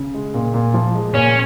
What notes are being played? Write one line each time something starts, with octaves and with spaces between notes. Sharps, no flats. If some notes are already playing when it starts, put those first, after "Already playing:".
Already playing: C#3
G#3
A#2
A#2
F3
G#3
A#2 C#4